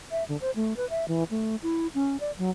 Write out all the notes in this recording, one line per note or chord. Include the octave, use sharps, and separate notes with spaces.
E5
D3
C5
A3
B4
E5
E3
A3
E4
C#4
D5
F#3